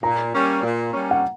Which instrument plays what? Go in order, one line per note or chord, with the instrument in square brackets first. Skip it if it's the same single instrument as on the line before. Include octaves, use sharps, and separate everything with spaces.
[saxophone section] A#2 [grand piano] A#5
[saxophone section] G3 A#3 C#4
A#2
G3 A#3 C#4
[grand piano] F#5